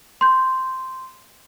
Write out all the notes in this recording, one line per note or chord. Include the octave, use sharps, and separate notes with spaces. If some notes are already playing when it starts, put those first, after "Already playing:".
C6 G6